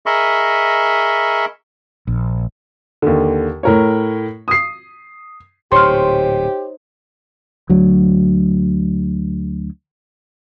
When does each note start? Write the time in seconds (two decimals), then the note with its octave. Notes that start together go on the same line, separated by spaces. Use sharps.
0.06 G#4 A#4 D#5 E5 B5 C#6
2.07 A#1
3.02 D#2 D3
3.63 A2 A#4 C#5
4.48 D#6 C7
5.72 D1 A#2 D#4 G4 C5 C#5 C6 F6
7.69 D2 F#3